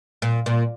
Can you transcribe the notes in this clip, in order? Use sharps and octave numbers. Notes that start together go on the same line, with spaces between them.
A#2
A#2